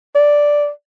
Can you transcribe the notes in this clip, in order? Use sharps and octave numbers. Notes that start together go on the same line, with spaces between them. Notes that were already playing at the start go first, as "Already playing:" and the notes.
D5